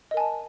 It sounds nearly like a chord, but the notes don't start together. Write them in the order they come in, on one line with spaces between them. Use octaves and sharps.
D#5 A#4 G#5 A5